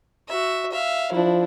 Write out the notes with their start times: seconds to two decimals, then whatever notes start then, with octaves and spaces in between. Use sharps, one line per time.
0.28 F#4 E5
0.72 E5 F5
1.12 F3 D4 E4